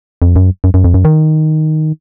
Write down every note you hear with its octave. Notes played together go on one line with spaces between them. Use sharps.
F2
F#2
F#2
F#2
F2
F#2
D#3